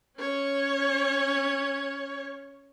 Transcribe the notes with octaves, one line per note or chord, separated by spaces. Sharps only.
C#4 C#5